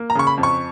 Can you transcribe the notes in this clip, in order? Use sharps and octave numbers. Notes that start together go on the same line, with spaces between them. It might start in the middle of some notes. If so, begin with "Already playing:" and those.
Already playing: A#3
A#5
C#3 C#6
B5
F2
C#6